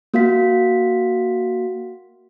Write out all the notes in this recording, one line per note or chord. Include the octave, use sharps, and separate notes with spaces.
A#3 F#4 F5 B6